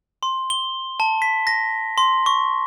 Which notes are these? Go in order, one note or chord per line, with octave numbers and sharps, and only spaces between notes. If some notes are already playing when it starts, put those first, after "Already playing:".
C6
G7
A5
B6
A#6
C6
C#6